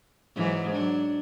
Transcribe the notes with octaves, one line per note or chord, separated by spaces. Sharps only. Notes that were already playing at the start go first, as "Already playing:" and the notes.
G#2 E3 F#3
F#3 D4